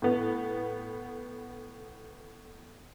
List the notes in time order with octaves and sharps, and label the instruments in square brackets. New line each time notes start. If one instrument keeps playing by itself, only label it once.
[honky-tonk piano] A2 B3